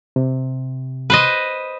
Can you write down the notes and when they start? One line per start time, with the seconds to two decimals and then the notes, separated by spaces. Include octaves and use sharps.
0.16 C3
1.10 B4 C5 D#5